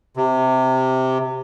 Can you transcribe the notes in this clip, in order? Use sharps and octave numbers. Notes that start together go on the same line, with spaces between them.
C3